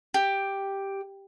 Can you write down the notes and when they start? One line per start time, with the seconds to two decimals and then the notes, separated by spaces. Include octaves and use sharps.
0.14 G4